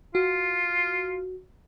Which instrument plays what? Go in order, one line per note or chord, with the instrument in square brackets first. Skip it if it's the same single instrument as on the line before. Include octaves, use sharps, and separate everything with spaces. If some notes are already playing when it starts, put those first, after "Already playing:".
[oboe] F4 [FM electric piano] F#4